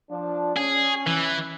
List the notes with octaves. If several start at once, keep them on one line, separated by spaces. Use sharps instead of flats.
F3 D4
C#4 G#4
E3